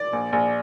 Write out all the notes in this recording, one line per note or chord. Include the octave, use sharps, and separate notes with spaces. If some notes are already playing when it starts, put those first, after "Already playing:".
Already playing: D5
A#1
A#1